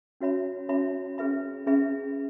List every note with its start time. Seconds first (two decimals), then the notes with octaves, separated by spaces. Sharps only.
0.20 C#4 F#4 C#5 E5 B5
0.69 C#4 F#4 C#5 E5 B5
1.18 C#4 G#4 B4 E5 B5
1.66 C#4 G#4 B4 E5 B5